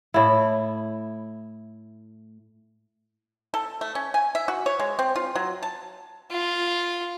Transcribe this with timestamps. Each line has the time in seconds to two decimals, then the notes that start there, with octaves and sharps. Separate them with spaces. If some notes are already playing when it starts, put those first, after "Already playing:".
0.14 A2 E4
3.54 A4
3.81 A3
3.95 C#4
4.14 G#5
4.35 E5
4.48 F#4
4.66 C#5
4.80 G#3
4.99 C4
5.16 F4
5.36 F#3
5.63 A5
6.31 F4